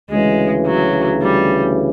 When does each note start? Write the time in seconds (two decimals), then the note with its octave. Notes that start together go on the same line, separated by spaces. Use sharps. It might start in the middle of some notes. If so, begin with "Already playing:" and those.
0.10 D2 C#3 E3 G#3
0.66 F#3
1.21 G3